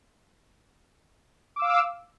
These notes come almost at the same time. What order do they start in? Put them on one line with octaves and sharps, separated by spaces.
D6 E6 F5